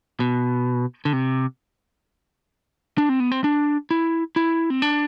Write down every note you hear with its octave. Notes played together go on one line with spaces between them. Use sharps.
B2
D3
C3
D4
C4
B3
C4
D4
E4
E4
C4
D4